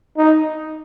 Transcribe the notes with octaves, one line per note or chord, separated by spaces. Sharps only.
D#4